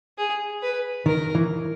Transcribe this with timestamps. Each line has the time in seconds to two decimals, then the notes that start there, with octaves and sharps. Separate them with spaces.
0.18 G#4
0.62 B4
1.06 D#3 A#4
1.35 E3